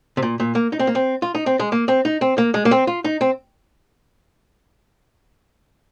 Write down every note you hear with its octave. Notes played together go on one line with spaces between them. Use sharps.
C3
A#2
A#2
A#3
D#4
C4
A#3
C4
F4
D#4
C4
G#3
A#3
C4
D#4
C4
A#3
G#3
A#3
C4
F4
D#4
C4